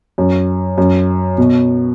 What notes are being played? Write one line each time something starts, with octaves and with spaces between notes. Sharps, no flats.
F#2
F#2
B2